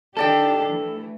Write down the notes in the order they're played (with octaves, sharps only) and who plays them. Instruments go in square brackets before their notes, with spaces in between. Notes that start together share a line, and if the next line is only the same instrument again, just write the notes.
[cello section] D#3 D4 G4 [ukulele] E4 D5 G5 [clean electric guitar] A4
[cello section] E3 A3